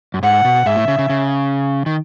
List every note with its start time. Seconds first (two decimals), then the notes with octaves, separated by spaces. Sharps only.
0.14 F#2
0.23 G#2 F#5
0.45 B2
0.66 G#2 E5
0.77 A2
0.88 C#3
0.99 C#3
1.10 C#3
1.86 D#3